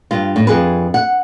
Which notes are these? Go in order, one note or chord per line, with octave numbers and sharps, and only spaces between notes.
G2 F4
A2
F2 G#4 B4
F#5